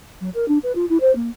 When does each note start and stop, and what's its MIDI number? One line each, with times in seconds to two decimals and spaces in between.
0.21 0.30 54
0.35 0.48 70
0.48 0.58 62
0.63 0.72 71
0.75 0.86 65
0.90 0.98 64
1.01 1.14 72
1.15 1.30 58